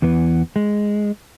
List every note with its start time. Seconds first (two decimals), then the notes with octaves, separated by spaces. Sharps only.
0.02 E2 E3 B3
0.56 G#3